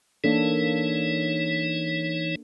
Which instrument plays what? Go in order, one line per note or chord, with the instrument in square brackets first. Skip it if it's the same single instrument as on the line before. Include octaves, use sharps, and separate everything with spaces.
[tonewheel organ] E3 D#4 C#5 [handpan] A#3 D4 A4